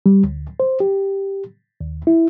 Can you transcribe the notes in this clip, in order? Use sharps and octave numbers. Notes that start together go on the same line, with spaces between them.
G3
D2
C5
G4
D#2
E4